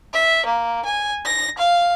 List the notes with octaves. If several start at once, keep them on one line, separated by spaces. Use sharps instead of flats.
E5
A#3
G#5
A#6
F5